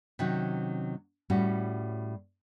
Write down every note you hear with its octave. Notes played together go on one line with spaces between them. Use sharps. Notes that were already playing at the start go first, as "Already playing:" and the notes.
C3 D#3 F#3 C#4 F#4
A2 G3 C#4 F#4